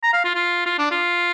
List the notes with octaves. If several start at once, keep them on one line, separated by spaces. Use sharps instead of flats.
A#5
F5
F4
F4
F4
D4
F4